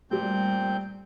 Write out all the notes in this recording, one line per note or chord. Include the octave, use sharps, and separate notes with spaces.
A#2 G3 A3 C4 G4 G6